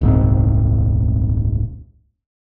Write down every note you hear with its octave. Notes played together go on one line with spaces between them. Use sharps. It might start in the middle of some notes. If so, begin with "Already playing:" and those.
D#1 C2 G#2 C4